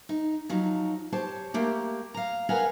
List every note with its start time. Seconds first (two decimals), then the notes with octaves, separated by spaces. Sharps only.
0.09 D#4
0.49 F3 F#3 D#4
1.12 G4 C5 C#5 A5
1.54 A3 A#3 G4
2.14 F5 A#5
2.49 G#4 A#4 B4 F5 F#5 G#5